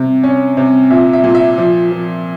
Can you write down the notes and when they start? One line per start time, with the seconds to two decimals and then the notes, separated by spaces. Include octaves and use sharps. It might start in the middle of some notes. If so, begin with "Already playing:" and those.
Already playing: C3
0.23 C#4
0.57 C3
0.90 A#2 E5
1.13 E5
1.24 A#2
1.35 E5
1.58 F3
1.91 F3